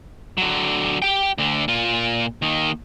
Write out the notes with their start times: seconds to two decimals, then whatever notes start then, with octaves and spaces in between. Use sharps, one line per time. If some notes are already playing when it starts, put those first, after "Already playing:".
0.38 D3 F#3
1.02 G4 G5
1.38 D2 D3
1.68 A#2 F4
2.42 D#2 D#3